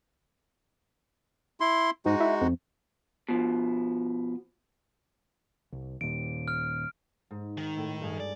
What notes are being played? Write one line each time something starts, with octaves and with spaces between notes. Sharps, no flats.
E4 C6
G#2 G#3 D#4 F#4
E4
F2
B2 F3
C2
D#2 A#2 D7
F6
G#2
D#3
A2
G2 G#4
D5